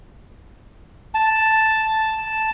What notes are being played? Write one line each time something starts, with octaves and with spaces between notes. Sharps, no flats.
A5